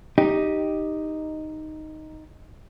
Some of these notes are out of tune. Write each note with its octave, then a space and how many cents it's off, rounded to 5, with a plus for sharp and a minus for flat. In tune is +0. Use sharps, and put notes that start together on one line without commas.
D#4 +0 G4 +0